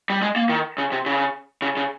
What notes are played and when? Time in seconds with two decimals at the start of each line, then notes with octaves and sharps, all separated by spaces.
0.10 G3
0.22 G#3
0.36 A#3
0.49 D#3
0.78 C#3
0.92 C3
1.06 C#3
1.62 C#3
1.77 C#3